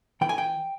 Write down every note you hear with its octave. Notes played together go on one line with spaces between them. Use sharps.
E3 G5
G#5
G5